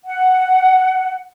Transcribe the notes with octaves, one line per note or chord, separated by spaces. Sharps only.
F#5